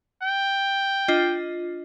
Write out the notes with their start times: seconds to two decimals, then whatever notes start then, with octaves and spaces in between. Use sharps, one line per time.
0.22 G5
1.08 D4 F4 D#5